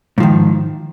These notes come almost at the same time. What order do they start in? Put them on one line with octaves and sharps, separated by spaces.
G#2 F3 D#3